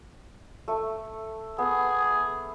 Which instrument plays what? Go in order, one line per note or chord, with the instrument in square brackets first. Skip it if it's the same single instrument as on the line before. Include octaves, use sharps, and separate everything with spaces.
[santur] A3
[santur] B3 [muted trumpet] G#4